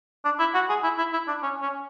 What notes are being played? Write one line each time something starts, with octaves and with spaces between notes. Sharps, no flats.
D4
E4
F#4
G#4
E4
E4
E4
D4
C#4
C#4